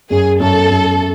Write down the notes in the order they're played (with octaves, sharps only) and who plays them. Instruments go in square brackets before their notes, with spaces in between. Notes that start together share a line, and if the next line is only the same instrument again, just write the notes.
[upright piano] F#2 [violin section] G#4
[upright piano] F#2 [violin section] A4
[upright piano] F#2